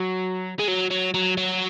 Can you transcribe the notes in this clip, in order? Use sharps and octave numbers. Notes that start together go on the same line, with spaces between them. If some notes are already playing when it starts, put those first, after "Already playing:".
Already playing: F#3
G#3
F#3
F#3
F#3
F#3